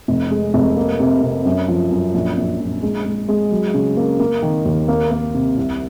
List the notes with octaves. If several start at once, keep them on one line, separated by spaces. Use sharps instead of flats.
F1
G#3
F1
A#3
C3
C3
F#2
F3
F#2
A#1
A#1
A#1
G#3
G#3
G#3
F#3
C#3
A#3
A#3
D#3
D#2
A#3
A#3
C3
C2